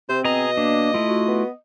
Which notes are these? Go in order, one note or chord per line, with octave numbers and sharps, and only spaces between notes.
C3 C4 C5
B2 G#4 D#5 A#5
A#3 D4
A3 E4 F4
F#4
B3